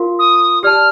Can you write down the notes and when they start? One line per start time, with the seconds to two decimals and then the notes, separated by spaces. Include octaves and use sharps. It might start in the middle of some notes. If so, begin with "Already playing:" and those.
Already playing: F4 A#4 F5 C6
0.19 D#6
0.63 G4 D5 A5 F6